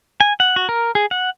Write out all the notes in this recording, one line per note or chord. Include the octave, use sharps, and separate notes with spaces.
G#5
F#5
F#4
A#4
G#4
F#5